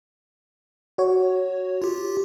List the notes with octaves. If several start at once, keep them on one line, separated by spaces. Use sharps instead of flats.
F#4 C#5
F4 G4